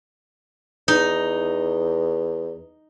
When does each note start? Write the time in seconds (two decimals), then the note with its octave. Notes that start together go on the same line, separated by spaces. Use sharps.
0.88 E2 D#4